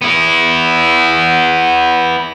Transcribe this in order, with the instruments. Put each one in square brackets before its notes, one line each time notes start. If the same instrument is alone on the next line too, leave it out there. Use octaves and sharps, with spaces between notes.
[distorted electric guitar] B3 E4